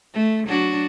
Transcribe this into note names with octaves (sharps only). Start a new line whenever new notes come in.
A3
F#3 D4 F#4